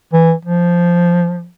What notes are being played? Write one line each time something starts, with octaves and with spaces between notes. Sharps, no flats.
E3
F3